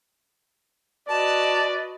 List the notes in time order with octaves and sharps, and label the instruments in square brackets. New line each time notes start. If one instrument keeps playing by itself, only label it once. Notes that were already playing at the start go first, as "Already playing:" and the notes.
[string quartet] F#4 B4 D#5 [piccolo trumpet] D5 [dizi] A5